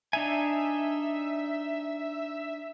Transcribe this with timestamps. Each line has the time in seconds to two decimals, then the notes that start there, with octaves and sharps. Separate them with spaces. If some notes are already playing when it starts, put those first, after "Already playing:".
0.13 D4 D#4 E5 G#5